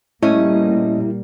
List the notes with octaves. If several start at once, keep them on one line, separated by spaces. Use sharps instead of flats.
A#2 G3 A3 A#3 C#4 E4 D#5